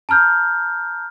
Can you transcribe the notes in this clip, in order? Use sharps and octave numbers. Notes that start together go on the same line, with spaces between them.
A5 A#5 F6 G6